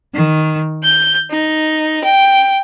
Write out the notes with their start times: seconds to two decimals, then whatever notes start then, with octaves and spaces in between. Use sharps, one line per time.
0.15 D#3
0.82 G6
1.30 D#4
2.03 G5